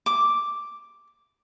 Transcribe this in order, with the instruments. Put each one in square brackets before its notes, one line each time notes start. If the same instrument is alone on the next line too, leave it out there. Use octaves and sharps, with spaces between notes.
[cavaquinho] D6